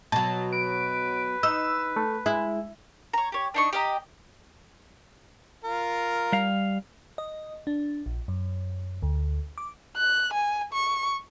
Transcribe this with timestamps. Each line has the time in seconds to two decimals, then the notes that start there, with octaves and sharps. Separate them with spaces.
0.12 B2 F#3 A5
0.53 B4 D7
1.43 D#4 E6
1.96 A3
2.26 G#3 E4
3.13 C#5 A#5
3.32 G4 C#5
3.54 D4 D#4 C#6
3.73 G4 D#5 A#5
5.64 F4 A#4
6.32 G3 F5
7.18 D#5
7.67 D4
8.06 A#1
8.28 F#2
9.03 D2
9.58 D6
9.97 F#6
10.33 G#5
10.73 C#6